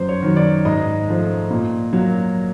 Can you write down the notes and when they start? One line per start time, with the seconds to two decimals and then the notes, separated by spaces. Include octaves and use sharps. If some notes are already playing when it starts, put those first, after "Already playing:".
Already playing: F#2 C5
0.09 C#5
0.22 D#3 F#3
0.37 D5
0.65 G#2 D#5
1.08 F3 A3
1.50 A#2
1.93 F#3 A#3